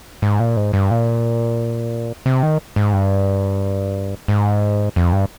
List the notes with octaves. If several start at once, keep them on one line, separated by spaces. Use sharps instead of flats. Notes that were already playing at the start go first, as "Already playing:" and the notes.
G#2
A#2
G#2
G2
A#2
C3
D#3
G#2
G2
G#2
F2
G2